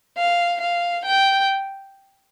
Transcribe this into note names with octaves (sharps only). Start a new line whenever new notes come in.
F5
F5
G5